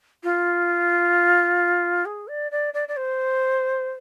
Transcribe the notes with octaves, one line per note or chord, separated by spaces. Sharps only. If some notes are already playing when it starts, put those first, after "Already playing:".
F4
G#4
D5
D5
D5
D5
C5